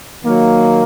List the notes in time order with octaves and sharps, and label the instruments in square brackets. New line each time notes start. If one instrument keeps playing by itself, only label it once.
[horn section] D#3 F#3 A#3